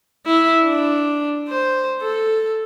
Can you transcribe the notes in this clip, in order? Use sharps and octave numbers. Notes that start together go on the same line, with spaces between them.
E4
D4
C5
A4